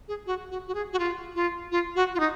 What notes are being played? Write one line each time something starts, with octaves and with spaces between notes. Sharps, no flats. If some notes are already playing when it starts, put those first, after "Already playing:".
G#4
F#4
F#4
F#4
G#4
F#4
F4
F4
F4
F#4
F4
D#4